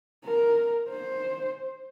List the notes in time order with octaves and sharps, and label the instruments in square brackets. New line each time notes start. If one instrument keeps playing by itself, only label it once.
[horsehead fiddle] A#4
C5